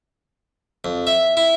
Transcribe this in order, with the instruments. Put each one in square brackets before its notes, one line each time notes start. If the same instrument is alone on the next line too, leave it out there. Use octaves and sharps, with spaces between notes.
[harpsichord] F2
E5
E4